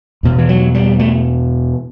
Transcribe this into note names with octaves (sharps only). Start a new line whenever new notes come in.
E2 B2
E3
F#3
G3
A3